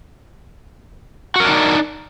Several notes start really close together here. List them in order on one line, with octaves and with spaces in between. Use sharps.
F#4 A#4 D4 D#4 D5